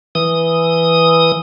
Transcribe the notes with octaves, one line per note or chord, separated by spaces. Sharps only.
E3 D#6